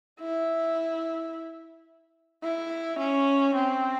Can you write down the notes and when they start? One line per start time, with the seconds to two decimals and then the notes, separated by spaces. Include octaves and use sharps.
0.20 E4
2.43 E4
2.99 C#4
3.55 C4